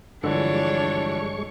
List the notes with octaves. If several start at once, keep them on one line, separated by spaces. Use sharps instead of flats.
G2 D3 E3 F3 G#3 D4 C#5 C#6